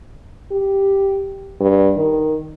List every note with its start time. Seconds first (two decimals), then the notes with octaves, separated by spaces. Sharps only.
0.52 G4
1.61 G2
1.97 D#3